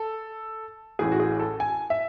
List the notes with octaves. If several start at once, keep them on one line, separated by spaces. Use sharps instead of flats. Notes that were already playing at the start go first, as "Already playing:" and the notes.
Already playing: A4
A1 A2 E3 G#4
F#4
G#4
A4
G#5
E5